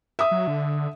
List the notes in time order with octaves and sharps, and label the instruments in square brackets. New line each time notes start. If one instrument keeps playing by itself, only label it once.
[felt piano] E5 D#6
[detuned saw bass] F#3
D3